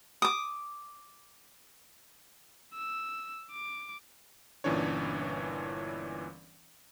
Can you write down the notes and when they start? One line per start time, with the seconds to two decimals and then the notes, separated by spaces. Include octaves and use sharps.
0.22 D6 D#6
2.74 E6
3.52 D6
4.64 G1 A#2 E3 C#4 D4 C#5